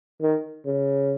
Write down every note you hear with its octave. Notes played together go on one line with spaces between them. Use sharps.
D#3
C#3